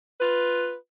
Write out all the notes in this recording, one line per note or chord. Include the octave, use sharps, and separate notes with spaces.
F4 B4